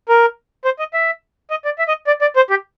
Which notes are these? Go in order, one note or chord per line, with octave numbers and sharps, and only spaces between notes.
A#4
C5
D#5
E5
D#5
D5
E5
D#5
D5
D5
C5
G4